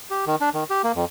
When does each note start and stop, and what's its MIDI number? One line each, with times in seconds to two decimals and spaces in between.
0.11 0.25 67
0.27 0.36 51
0.41 0.50 62
0.54 0.64 51
0.70 0.82 67
0.84 0.92 58
0.95 1.05 41